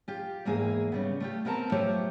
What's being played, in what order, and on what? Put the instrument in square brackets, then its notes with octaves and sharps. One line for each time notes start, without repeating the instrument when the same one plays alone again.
[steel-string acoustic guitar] F4 G4
E2 G#2 E3 A#3 G#4
C#3 G3 B3
A3 F4 G4
B3 C4 A#4 E5 A5 A#5
F#3 A3 F4 G4 C5 C#5